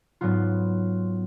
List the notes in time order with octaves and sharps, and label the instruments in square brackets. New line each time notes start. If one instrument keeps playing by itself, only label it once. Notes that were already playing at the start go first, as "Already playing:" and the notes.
[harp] G#2 F#3 B3 F4